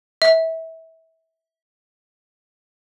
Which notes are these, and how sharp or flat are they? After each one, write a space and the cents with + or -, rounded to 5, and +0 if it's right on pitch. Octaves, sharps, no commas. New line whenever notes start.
E5 -25